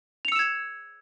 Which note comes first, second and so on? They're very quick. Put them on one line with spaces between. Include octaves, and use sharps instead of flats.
F7 C#7 E6 E7 G#6